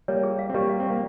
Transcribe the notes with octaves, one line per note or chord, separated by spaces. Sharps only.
G3 A#3 C#5
G#4
F5
C4
G3 A#3 G4
F5
C4
A#3 G4